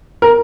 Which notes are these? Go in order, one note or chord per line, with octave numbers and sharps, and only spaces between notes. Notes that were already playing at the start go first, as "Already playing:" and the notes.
A#4